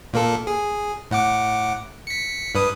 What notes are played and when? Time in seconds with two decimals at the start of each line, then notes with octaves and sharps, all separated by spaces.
0.13 A#2 A#3 A4
0.47 G#4
1.11 A2 F#5 D6
2.07 B6 C#7
2.55 G2 B4 D#6